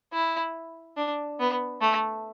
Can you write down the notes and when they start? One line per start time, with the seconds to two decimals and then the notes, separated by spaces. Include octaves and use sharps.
0.13 E4
0.97 D4
1.40 B3
1.81 A3